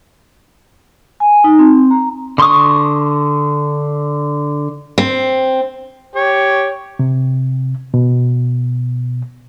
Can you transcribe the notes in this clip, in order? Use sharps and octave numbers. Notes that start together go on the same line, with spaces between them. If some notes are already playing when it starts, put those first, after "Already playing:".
G#5
D#4
C4
A#5
D3 C6 C#6 D#6
C4
G4 C#5
C3
B2